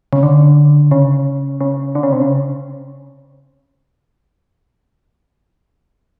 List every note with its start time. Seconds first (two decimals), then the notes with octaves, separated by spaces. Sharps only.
0.13 C#3
0.23 D3
0.91 C#3
1.61 C#3
1.95 D3
2.03 C#3
2.12 C3
2.22 C#3